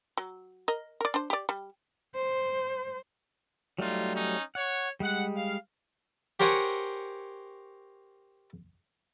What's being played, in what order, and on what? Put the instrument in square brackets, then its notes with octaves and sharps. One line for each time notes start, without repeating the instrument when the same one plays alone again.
[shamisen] F#3
A#4 D#5
A#4 D5
D4 C5
G4 D5
G3
[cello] C5
[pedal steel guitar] F#3 G3 A3 [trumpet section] D#4 F4
[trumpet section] C#4 D#4
[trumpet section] C#5 [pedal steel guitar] F#5
[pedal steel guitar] G3 G#3 [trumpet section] F#5
[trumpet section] F5
[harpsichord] G4 A#4 C5 C#5 F#5 G#5